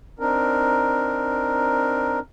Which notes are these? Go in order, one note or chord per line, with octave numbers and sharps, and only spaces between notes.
C4 D4 D#4 A#4